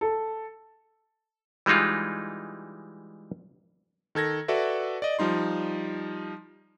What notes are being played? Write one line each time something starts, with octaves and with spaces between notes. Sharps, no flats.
A4
E3 G3 G#3 D#4 F4
D#3 A4 G#6 A#6
F#4 A4 B4 D5 E5
D5 D#5
F3 G3 D#4 C6